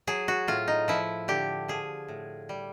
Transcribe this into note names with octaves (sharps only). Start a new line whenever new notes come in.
F#3 G#4
F#4
A2 F4
D#4
F3 E4
D3 G4
F3 G#4
A2
G3